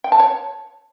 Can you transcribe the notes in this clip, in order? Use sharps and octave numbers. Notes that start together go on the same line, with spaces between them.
G5
A5
C#5